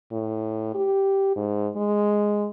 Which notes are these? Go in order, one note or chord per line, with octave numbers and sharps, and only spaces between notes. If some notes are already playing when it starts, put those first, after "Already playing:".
A2
G4
G#2
G#3